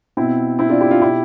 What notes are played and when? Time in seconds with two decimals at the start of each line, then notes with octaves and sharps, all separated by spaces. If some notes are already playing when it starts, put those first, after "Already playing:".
0.17 B2 C4 E4
0.59 C4 E4
0.69 D4 F4
0.80 E4 G4
0.91 D4 F4
1.01 B2 E4 G4